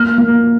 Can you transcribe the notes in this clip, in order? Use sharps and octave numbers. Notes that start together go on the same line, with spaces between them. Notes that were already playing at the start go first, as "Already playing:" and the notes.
Already playing: A#3 F6
A#3